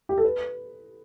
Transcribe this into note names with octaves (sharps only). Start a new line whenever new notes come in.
G4
A4
B4